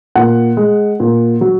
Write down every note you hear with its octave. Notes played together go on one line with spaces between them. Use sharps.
A#2 F#5
G#3
A#2
F#3